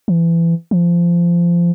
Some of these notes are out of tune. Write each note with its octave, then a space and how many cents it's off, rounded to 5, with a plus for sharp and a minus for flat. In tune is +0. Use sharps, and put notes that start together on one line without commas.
E3 +25
F3 -20